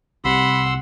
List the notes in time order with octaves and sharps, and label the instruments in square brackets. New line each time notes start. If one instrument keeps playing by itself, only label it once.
[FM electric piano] C2 C3 [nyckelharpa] F#5 [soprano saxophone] B5 [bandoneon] C6 E6